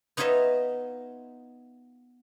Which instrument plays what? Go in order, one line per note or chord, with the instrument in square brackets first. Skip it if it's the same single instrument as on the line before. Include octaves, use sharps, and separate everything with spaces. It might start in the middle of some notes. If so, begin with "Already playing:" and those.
[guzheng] B3 D#4 F4 C#5 D#5 E5